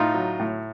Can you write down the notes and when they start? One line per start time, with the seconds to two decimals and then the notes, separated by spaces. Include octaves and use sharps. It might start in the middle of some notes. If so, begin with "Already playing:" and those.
Already playing: A2 D#4 F4
0.14 F#3
0.39 A2